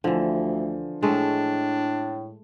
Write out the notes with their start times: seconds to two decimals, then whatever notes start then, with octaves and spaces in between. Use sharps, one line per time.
0.04 D2 D3 E3 F3
1.03 A2 G#3 A3 D4